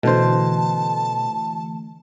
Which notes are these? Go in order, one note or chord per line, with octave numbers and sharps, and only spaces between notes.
B2 D3 E3 A3 C5 A5